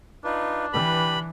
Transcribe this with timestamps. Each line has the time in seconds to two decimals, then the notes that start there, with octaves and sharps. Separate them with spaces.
0.25 D4 D#4 F4 B4
0.73 E3 G4 B4 B5